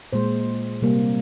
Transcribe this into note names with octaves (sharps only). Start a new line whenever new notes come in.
A#2 G#3 C5
C3 G3 A#3